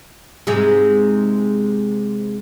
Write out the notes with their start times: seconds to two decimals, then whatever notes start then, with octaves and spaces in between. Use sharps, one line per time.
0.47 G#2 C3 G#3